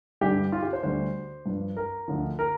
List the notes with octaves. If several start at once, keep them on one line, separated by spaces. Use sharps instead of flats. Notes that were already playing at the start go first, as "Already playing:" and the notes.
G2 D3 G3 G4
F4
G4
C5
D2 D3 G3 C5
G2 F3
A#4
D2 D3 F3
A#4